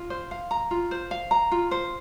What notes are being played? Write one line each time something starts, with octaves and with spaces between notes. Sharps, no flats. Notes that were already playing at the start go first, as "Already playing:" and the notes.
Already playing: F4
C5
F5
A#5
F4
C5
F5
A#5
F4
C5